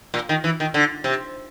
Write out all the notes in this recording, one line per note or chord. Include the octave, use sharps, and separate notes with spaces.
A#2
D#3
E3
D#3
D3
C3